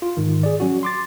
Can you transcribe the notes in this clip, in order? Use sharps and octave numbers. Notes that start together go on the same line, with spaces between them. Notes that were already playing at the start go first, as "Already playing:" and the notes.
F4
G#2 D#3
G#4 D5
F#3 C#4 F#4
C6 D6 A6